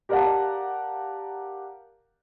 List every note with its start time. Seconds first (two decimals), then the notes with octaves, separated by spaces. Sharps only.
0.09 G4 A#4 D5 F5 F#5 A5